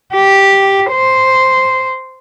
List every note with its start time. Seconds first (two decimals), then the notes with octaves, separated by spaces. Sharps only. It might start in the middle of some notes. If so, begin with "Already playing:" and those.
0.13 G4
0.91 C5